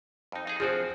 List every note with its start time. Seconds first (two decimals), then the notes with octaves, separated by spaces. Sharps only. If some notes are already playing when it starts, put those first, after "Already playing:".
0.32 F2 D#4
0.47 D#4 G#4
0.60 F3 C4 F#4 G#4 C5